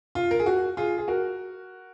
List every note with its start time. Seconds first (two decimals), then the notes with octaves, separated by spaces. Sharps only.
0.15 F4
0.31 A#4
0.39 G#4
0.46 F#4
0.77 F4 G#4
0.98 G#4
1.08 F#4 A#4